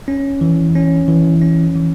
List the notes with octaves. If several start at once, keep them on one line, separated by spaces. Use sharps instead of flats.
C#4
E3
C#4
E3
C#4
E3